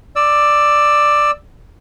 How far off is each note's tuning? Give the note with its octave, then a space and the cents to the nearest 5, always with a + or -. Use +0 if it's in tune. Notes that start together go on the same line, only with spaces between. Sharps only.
D5 +10 E6 +0